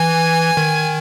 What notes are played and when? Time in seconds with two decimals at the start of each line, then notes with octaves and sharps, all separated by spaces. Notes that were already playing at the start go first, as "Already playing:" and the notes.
Already playing: E3 G#5
0.57 D#3